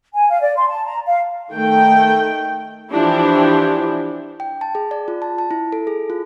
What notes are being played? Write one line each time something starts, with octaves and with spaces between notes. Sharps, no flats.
G#5
F5
D5
C6
A5
A#5
F5
D#3 A3 G5
E3 F3 D4 E4 G4
G5
A5
G#4
D5
F4
A5
A5
E4
A4
G#4
F4